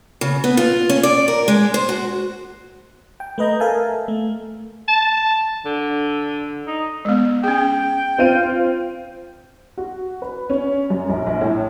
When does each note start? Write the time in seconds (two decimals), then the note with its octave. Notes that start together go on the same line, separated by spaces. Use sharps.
0.21 C#3
0.44 B3
0.57 F4
0.89 C#4
1.03 D5
1.28 A#4
1.48 G#3
1.74 C5
1.89 F#4
3.20 G5
3.38 A3 B4 D#5 A#5 G6
3.60 A4 A#4 E5 F5 G#5 A5
4.08 A3
4.88 A5
5.65 D3
6.67 D#4
7.05 G#3 B3
7.44 C#4 G#4 G5
8.18 C4 F4 D#7
9.78 F#4
10.22 B4
10.50 C#4
10.90 F#2
11.09 A#1
11.27 A#1
11.41 A2